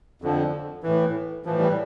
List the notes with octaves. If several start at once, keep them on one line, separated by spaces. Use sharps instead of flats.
F2 D3 F3
A2 E3
A2 E3 F3
G3